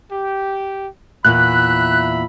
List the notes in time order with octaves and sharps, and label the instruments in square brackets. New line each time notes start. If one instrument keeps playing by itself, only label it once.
[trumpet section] G4
[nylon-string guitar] E2 A#2 [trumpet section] E5 B5 [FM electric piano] F#6